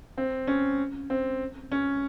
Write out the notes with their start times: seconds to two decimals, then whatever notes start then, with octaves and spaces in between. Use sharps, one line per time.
0.18 C4
0.47 C#4
1.10 C4
1.72 C#4